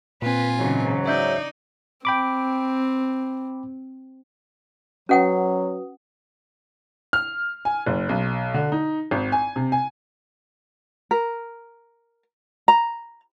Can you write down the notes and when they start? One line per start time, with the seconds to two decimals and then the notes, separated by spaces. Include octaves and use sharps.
0.22 A#2 C4 F4 B4 G#5
0.58 G#2 C#3 E3 F#3
1.06 D#4 C#5 D5 E5 G6
2.05 C4 G5 B5 D6
5.09 F#3 C#4 F#4 B4 F#5 G5 D#6
7.13 F6
7.65 G#5
7.86 F#1
8.09 B1
8.54 D3
8.72 D#4
9.11 G#1
9.32 G#5
9.56 C3
9.72 G#5
11.11 A#4
12.68 A#5